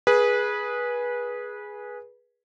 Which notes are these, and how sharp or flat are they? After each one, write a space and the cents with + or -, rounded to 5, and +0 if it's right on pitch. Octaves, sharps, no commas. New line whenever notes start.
G#4 +0 B4 -20